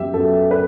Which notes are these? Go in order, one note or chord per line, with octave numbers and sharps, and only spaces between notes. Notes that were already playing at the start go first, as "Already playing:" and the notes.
Already playing: F#2 B3 G4 E5
F#2 F#3 B3 A4
B4